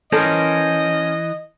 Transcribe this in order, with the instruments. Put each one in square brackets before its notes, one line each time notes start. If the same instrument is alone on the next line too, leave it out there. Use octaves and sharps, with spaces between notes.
[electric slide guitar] E3 [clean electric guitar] C#4 A#4 C5 [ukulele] A4 [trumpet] D#5